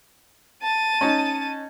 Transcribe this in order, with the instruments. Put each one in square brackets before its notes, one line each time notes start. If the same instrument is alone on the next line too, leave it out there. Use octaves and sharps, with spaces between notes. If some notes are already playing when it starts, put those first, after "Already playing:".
[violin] A5 D#7
[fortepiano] C#4 D#4